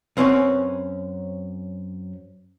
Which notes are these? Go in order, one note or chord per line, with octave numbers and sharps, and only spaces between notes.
F#2 C4 C#4 B4 C#5